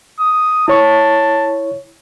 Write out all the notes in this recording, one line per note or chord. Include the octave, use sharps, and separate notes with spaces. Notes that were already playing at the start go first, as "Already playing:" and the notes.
D#6
E4 C#5 A5 C#6